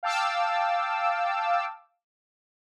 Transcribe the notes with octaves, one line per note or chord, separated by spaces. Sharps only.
F5 G5 A5 D6 E6